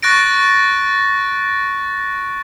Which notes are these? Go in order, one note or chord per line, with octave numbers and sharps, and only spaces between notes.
C#6 F#6 A6 A#6 D7